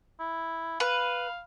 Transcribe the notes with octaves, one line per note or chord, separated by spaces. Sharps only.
E4
B4 F5